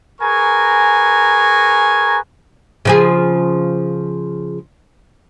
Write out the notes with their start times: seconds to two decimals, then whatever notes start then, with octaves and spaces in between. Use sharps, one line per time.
0.21 G#4 A#4 B4 G#5 A#5 C#6
2.85 C#3 F3 G#4